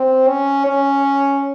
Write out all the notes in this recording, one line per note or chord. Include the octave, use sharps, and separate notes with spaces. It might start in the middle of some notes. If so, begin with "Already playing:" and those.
Already playing: C4
C#4
C#4